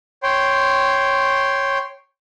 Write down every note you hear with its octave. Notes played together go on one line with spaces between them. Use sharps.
C#5 G5 C6